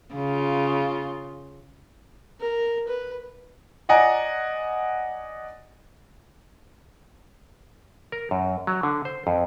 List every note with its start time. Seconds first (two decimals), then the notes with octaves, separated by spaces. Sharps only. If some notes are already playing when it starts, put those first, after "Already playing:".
0.14 C#3 F4
2.40 A#4
2.88 B4
3.89 D5 D#5 F#5 G#5 A#5
8.12 A#4
8.31 F#2
8.67 F#3
8.83 D3
9.05 C5
9.27 F2